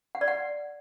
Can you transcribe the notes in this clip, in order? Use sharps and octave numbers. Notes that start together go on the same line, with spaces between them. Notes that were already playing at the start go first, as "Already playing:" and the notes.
F#5
D5
F#5